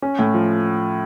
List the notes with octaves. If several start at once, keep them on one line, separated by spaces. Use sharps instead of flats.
C#4
A2
F3